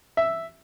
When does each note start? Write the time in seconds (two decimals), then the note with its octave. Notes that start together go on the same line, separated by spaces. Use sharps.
0.17 E5